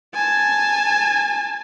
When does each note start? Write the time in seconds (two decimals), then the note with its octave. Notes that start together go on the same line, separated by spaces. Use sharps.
0.14 G#5 A5